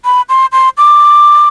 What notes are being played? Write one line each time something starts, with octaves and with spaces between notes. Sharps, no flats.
B5
C6
C6
D6